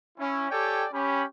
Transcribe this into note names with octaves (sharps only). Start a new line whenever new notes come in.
C#4 E4
G4 A4 C#5 D5 G5 G#5
C#4 G4 B5